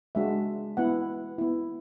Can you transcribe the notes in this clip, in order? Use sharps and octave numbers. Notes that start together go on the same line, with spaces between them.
G#3 D4 F#4 E5
B3 E4 F#5
B3 E4